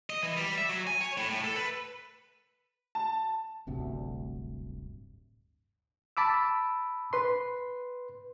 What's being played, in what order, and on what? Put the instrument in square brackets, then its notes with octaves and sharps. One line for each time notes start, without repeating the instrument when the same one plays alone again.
[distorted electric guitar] D#5
E3
G3
E5
F#3
G#5
C#5
A2
A2
A4
B4
[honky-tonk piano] A5
[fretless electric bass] D1 G1 D2 C3
[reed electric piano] A5 B5 D6 E6
B4 C6